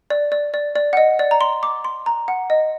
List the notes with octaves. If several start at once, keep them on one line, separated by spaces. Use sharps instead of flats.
D5
D5
D5
D5
F#5
D#5
D5
A#5
C6
D6
C6
A#5
F#5
D#5